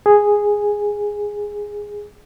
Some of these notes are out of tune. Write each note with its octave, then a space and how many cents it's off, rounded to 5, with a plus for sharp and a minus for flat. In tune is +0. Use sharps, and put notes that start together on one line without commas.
G#4 -5